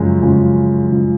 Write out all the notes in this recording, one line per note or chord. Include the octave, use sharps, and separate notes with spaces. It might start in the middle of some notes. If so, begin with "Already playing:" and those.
Already playing: F#2 C#3 F3 G#3
F#2 C#3 F3 G#3
C#3 F3 G#3